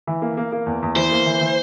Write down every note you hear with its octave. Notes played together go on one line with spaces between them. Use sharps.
E3
A#3
A#3
A#3
E2
E2
E3 C5
A#3
E3
E3